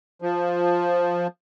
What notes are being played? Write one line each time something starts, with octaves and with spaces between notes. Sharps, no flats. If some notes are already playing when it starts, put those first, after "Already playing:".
F3